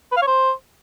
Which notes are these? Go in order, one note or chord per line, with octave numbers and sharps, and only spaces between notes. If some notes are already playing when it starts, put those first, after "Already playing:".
B4
F5
C#5
C5